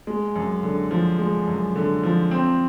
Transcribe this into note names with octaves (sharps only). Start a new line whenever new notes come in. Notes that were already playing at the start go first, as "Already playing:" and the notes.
G#3
F#2
D3
F3
G#3
F#2
D3
F3
C4